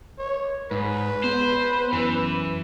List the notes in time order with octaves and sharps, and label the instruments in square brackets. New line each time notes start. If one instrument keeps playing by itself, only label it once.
[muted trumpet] C#5
[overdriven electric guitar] G#2 [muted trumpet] B4
[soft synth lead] B3 [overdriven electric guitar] C5
[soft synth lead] F#2 [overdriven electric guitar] E3